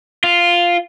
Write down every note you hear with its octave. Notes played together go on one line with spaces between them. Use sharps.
F4